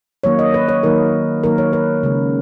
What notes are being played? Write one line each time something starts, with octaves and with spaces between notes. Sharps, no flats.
D#3 F#3 A#3 C#5
D#5
B4
C#5
D#3 F#3 A#3 A#4
D#3 F#3 A#3 A#4
C#5
B4
C#3 G#3